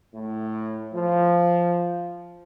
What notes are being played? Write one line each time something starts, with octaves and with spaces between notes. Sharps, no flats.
A2
F3